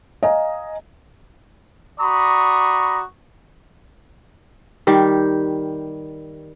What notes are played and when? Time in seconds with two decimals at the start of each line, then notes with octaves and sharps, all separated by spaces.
0.23 D#5 F5 G#5 A#5
2.00 F#4 D5 A#5 B5 C#6 D#6
4.87 D#3 G3 G4